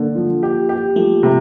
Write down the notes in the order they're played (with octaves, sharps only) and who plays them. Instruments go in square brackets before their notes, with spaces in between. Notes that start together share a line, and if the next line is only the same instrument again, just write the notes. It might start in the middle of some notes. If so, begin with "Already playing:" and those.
Already playing: [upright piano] D3 [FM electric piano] A#3
[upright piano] F3
G4
G4
[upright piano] F3 [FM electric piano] A3
[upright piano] C3